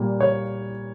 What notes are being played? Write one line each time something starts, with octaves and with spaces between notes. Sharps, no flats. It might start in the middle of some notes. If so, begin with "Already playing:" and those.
Already playing: A#2 G3 A#3
C#5